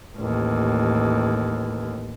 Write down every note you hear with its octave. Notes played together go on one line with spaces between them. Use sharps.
A1 D#2